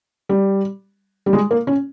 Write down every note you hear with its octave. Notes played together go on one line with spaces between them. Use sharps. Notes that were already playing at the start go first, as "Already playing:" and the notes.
G3
G3
G#3
A#3
C#4